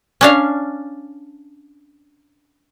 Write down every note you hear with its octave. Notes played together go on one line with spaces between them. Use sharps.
C#4 D4 F5